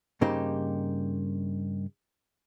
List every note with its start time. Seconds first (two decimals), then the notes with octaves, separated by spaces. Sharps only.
0.21 G2 C#3 A#3 D#4 G4 C5